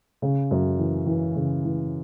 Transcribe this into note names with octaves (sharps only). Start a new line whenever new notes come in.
C#3
F#2
E3
E3
C#3
E3